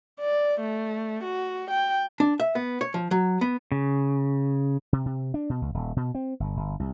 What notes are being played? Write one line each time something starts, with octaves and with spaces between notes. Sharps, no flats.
D5
A3
F#4
G5
D4
E5
B3
C#5
F3
F#3
B3
C#3
C3
C3
D4
B2
C#2
D#1
B2
C4
G1
G1
C2